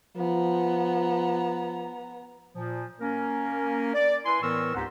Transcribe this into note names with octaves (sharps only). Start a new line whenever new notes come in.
F3 B3 A#5
A#2 F3
A#3 C#4 A#4
D5
E4 B4 G#5 C6
A2 E3 B3 A#4 C#6 E6
C#2 G#2 C4 G4 F#5 A#5